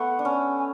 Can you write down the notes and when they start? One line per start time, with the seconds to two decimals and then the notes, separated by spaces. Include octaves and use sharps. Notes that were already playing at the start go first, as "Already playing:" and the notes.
Already playing: A3 B3 F#5
0.19 D4
0.25 C#4
0.58 G#5